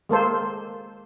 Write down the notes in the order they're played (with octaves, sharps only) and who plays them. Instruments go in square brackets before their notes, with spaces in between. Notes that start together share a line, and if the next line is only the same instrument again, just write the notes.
[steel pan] G#3 A#3 A4 C5